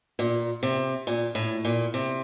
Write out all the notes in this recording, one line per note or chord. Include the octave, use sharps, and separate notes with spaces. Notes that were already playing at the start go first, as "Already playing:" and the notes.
A#2
C3
A#2
A2
A#2
C3